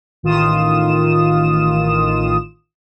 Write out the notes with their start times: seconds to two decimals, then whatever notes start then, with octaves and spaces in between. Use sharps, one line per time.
0.23 A1 D#3 F4 D#6 E7